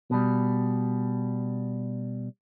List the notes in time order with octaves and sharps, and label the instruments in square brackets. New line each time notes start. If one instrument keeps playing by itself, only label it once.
[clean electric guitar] B2 G3